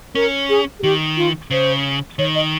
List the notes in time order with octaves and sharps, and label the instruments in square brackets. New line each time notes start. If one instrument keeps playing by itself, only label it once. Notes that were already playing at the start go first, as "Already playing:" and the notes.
[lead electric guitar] C#4 [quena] A#4
[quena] G#4
G#4
[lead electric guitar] D#3 [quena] G4
[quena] F4
[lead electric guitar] C#3 [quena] C5
[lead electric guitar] D#3 [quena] C#5
[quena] D#5